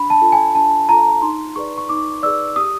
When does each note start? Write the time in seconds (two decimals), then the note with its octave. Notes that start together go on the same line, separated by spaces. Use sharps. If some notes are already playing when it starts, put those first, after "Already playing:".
Already playing: D4 B5
0.10 A5
0.21 F4 A4
0.32 G#5
0.55 D4 A5
0.89 F4 A4 A#5
1.22 D#4 C6
1.56 G#4 B4 D5 C#6
1.78 C#6
1.89 D#4 D6
2.23 G#4 B4 D5 E6
2.56 G4 D#6